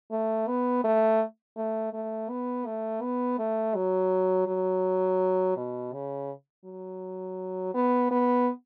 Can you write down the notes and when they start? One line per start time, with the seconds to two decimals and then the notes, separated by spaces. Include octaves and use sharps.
0.12 A3
0.48 B3
0.84 A3
1.57 A3
1.93 A3
2.30 B3
2.66 A3
3.02 B3
3.39 A3
3.75 F#3
4.47 F#3
5.57 B2
5.93 C#3
6.65 F#3
7.74 B3
8.11 B3